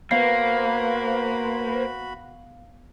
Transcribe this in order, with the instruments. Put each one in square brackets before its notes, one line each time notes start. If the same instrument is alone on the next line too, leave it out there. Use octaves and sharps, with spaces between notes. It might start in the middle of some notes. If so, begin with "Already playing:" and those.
[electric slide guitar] A#3 [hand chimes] B3 F5 C7 [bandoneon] F#4 B5 [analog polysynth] B4 C5